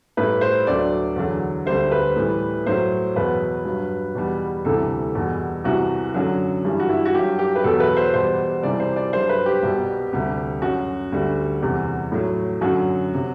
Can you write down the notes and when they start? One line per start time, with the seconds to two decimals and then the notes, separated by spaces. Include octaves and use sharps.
0.17 A2 G3 B4
0.41 C5
0.67 D2 D3 F#3 D5
1.16 E2 D3 F#3
1.66 D2 D3 G3 C5
1.91 B4
2.16 A2 E3 G3
2.66 A2 F#3 C5
3.15 E2 B2 F#3 B4
3.65 G2 F#3
4.15 E2 B2 G3
4.65 D2 C3 E3 G3 A4
5.15 E2 B2 G3
5.64 C2 C3 E3 F#4
6.14 F#2 D3 F#3
6.65 G2 E3 G3
6.80 F#4
6.89 E4
7.05 F#4
7.14 G2 F#3 G4
7.39 G4
7.55 B4
7.64 E2 B2 F#3 A4
7.80 B4
7.97 C5
8.14 E2 B2 G3 C5
8.63 C2 C3 E3 G3 D5
8.80 C5
8.96 D5
9.13 G2 F#3 C5
9.29 B4
9.46 G4
9.62 C2 B2 G3
10.13 D2 C3 G3
10.62 F#2 F#3 F#4
11.12 D2 D3 G3
11.62 E2 C3 G3
12.12 A2 F#3
12.61 F#2 D3 F#3 F#4
13.14 C3 F#3